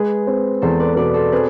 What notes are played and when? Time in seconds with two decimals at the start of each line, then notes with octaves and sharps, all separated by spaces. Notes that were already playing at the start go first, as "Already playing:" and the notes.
Already playing: G#3 G#4 B4
0.27 C4
0.62 E2 A4 C5
0.80 B4 D5
0.97 B2 B4 D5
1.14 A4 C5
1.32 C4 G#4 B4